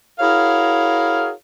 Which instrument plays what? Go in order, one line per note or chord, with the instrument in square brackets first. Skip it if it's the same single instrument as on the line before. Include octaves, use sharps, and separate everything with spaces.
[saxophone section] E4 F#4 G#4 A#4 C#5 F5